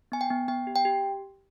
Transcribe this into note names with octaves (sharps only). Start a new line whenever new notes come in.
B3 G#5
G5
B3
B3 G5
G4
G5
G4